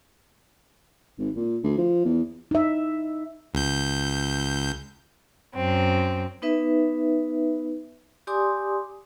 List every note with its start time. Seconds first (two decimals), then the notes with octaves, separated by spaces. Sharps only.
1.18 G#1
1.36 A#2
1.63 D2
1.78 F3
2.05 E2
2.51 D#4 E5
3.54 C#2 G6
5.53 F#2 C4
6.42 B3 D#4 B4 E5
8.27 G4 D5 G#5 C6 D6 D#6